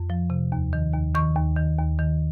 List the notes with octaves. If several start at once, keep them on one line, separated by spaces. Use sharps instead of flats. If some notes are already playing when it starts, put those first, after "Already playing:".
Already playing: F2
F3
C3
D#2
D#3
D#2
D#3 C#6
D#2
D#3
D#2
D#3